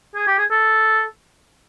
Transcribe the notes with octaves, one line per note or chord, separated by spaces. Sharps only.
G#4
G4
G#4
A4